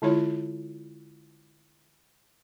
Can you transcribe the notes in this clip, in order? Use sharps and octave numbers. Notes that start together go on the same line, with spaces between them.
D3 G#3 E4 F4 C#5